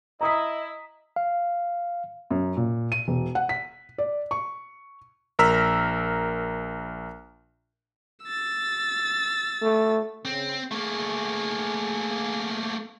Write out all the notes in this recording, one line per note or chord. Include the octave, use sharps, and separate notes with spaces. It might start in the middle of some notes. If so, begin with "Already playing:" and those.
E4 D#5 A#5 D#6 B6
F5
F#2
A#2
D#7
E1
F#5
B6
D5
C#6
A#1 A#4 A#5 E6 F6 B6
E6 A6
A3
C#3 C4
A3 A#3 G#4